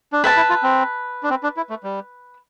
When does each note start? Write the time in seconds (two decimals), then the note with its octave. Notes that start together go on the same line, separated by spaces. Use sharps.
0.13 D4
0.24 C4 B4 E5 A5
0.36 E4
0.49 F4
0.63 C4
1.23 D4
1.30 C4
1.43 D4
1.57 E4
1.70 A3
1.84 G3